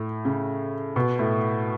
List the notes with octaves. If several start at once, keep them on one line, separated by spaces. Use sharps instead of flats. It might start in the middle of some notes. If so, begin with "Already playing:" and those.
Already playing: A2
C#3
B2
A2